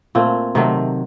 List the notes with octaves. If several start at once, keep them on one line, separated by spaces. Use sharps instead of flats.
A#2 A3 C4
C3 D#3 F#3 A3